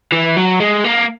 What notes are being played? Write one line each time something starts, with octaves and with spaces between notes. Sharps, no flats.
E3
F#3
G#3
A#3